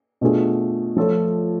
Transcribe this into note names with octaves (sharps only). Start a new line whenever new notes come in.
B2 A3 D4 F4 G#4
F3 A3 F4 A4 C#5